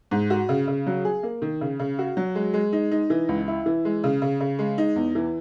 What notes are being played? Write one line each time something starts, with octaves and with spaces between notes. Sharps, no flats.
G#2
F#4
C#3
C#3
F#3
G#4
A#3
D#3
C#3
C#3
F#4
F#3
G#3
G#3
D#4
D#4
E3
C#2
E4
E3
G#3
C#3
C#3
C#3
G#3
D#4
E2
E3